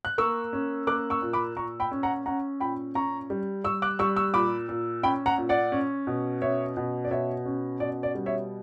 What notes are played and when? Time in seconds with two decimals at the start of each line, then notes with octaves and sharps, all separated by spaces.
0.05 F#6
0.18 A#3 C#6 E6
0.53 C#4
0.87 A#3 D6 F#6
1.10 C#6 E6
1.22 A#2
1.33 B5 D6
1.56 A#2 A#5 C#6
1.80 G5 B5
1.92 C#4
2.03 F#5 A#5
2.26 C#4 F#5 A#5
2.60 A#2 G5 B5
2.95 C#4 A#5 C#6
3.30 G3
3.64 G3 C#6 E6
3.82 D6 F#6
3.99 G3 C#6 E6
4.16 C#6 E6
4.33 A#2 B5 D6
4.69 A#2
5.03 C#4 G5 B5
5.26 F#5 A#5
5.38 A#2
5.49 D5 F#5
5.72 C#4
6.07 B2
6.42 C#4 C#5 E5
6.77 B2
7.04 D5
7.11 B2 C#5 E5
7.46 C#4
7.80 B2 D5
8.03 D5
8.15 G3
8.26 C#5 E5